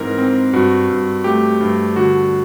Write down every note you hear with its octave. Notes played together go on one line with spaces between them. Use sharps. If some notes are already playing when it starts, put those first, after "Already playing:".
Already playing: G#2 E3 C4 A#4
C4
G2 F#4
G2
A3 G4
G2
D3 F#4